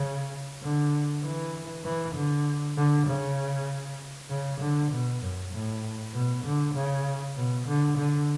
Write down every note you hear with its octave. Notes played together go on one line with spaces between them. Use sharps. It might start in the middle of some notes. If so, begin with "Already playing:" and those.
Already playing: C#3
D3
E3
E3
D3
D3
C#3
C#3
D3
B2
F#2
A2
B2
D3
C#3
B2
D3
D3